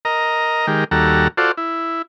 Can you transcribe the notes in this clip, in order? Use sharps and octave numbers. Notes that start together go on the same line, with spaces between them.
A#4 D#5 A#5
D#3 G#3 G4 A#4
D#2 G3 F#4 A4 A#5
F4 F#4 A4 C5 D5
E4